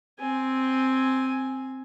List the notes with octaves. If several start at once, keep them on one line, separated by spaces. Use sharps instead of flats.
C4 G#5